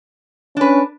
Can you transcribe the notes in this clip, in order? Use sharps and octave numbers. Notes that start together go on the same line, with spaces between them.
C#4 D4 B4